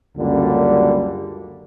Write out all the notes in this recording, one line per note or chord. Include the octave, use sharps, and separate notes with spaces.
C#2 F#2 D3 G3 A#3